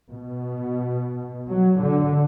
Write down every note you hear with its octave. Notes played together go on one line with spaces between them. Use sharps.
B2
F#3
D3